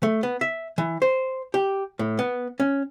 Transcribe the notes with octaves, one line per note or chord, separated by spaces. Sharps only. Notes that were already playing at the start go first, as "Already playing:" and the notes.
A3
B3
E5
E3
C5
G4
A2
B3
C#4